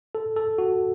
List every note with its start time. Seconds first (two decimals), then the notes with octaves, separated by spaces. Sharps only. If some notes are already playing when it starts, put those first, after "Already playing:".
0.15 A4
0.36 A4
0.58 F#4